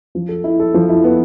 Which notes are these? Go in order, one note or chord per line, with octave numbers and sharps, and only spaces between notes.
F3
A4
E4
A4
F3
E4
B3